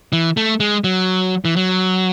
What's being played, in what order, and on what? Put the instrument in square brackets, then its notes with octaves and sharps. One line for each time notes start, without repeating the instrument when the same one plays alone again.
[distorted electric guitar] E3
A3
G#3
F#3
E3
F#3